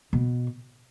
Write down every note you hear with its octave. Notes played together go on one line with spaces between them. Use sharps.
B2